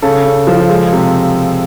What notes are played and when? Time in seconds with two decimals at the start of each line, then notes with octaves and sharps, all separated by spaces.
0.02 C#3 A4
0.25 C#3
0.47 F3
0.70 G#3
0.93 C3